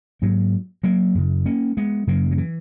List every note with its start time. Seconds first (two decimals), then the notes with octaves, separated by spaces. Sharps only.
0.22 G#2 F#3 A#3
0.83 F#3 A#3
1.15 F#2 C#3
1.46 A#3 C#4
1.77 G#3 B3
2.07 F#2 C#3 F#3 A#3
2.31 F#3
2.38 E3